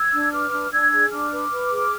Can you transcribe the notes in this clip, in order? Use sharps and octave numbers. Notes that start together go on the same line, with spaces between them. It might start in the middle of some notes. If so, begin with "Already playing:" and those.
Already playing: E6 G#6
D4
B4 D6 F6
D4
D4 E6 G#6
G#4
D4 D6 F6
B4
B4
G#4